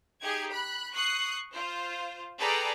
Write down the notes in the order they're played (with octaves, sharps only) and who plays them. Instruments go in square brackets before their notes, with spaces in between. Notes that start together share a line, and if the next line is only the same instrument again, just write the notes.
[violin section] D#4 G4 G#4 G#6
B5 F#6
C#6 D#6 F#6 C7
F4 C5
G#4 A4 B4 D5 G5 A#5